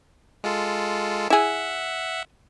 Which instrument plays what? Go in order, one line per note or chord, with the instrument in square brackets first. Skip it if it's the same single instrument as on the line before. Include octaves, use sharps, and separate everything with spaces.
[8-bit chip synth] G#3 F4 A4
[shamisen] E4 G#4 [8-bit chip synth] E5 F#5